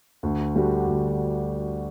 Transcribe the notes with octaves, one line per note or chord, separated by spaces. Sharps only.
D2
D3 G3 D4 F#4
D2